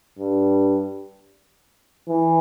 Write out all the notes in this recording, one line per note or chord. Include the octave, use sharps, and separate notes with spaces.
G2
E3